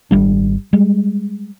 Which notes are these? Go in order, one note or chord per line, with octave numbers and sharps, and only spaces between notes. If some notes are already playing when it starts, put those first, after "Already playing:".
G#1 G3 D4
G3 G#3